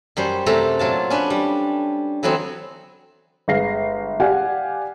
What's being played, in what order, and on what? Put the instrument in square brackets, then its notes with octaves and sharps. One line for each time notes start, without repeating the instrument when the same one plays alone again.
[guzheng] F#2 G3 C5
F#2 C3 A3 A4 A#5
A#2 F#3 F4 A5
C#4 D4 B4
G3
D3 E3 F#3 B3 C4
[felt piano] G1 G#3 F5 A#6 C7
G4 D5 F5 F#5 G#5